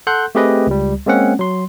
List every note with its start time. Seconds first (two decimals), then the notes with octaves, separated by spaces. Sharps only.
0.07 A4 F#5 C6 F#6 G6
0.35 A3 C4 G4 G#4 B4 D#5
0.67 C#2 G3
1.06 G#3 A#3 C4 C#4 F#5
1.39 F#3 C6